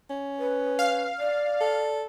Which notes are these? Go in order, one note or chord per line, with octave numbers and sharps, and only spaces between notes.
C#4
B4
F5
D5
A4